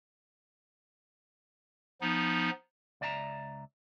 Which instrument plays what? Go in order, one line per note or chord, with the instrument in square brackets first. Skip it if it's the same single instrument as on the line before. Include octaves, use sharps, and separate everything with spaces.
[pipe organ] F3 B3 D#4
[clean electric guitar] C#2 D5 E5 G#5 A#5